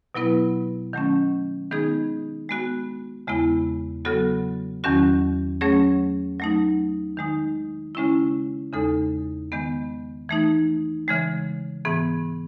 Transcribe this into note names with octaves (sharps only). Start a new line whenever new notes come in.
B2 F#3 B3 E4 B4
D#3 F#3 A3 C#4
D#3 G#3 B3 D#4 G#4
G#3 B3 F#4
E2 C#3 G#3 B3 E4
C#3 F#3 B3 F#4 A4
E2 D#3 F#3 C#4 F#4
F#3 A3 C#4 G#4 C#5
F#3 A3 D#4
D#3 G#3 D#4
C#3 G#3 C#4 E4
E2 C#3 G#3 D#4 A4
D#3 G#3 B3
E3 A3 D#4
C#3 E3 G#3
G#2 E3 B3